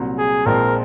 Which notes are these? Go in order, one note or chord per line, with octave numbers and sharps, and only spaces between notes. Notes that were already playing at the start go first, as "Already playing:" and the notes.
Already playing: C2 A#2 F#3
G#4
A#1 A#2 F3 G#3 C4 A#4